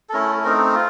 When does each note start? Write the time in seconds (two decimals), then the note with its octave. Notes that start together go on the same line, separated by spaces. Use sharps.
0.09 A4
0.13 A3 C#4 E4 A#4
0.29 A4
0.44 A3 C4 D#4 A#4
0.75 F4